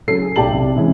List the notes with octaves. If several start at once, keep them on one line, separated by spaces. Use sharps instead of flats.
C#3 F#3 A4 C7
G#4
B1 G4 D5 A5 F#7
C2
C3 E3 G#3 C#4 G#4